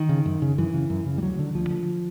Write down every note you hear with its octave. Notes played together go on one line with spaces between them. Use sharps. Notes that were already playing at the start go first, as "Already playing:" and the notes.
Already playing: D#3
C#3
F#2
C#3
F#2 E3
C#3
F#2
C#3
G3
D2 F#3
D3
D2 F3
D3